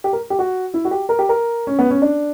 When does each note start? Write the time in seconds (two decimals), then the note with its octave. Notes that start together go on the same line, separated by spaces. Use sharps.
0.04 G4
0.13 A#4
0.30 G4
0.39 F#4
0.74 E4
0.85 F#4
0.91 G4
1.09 A#4
1.19 G4
1.29 A#4
1.67 C#4
1.79 B3
1.90 C#4
2.02 D4